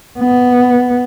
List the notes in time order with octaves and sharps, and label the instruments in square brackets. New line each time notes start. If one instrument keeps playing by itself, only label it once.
[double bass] B3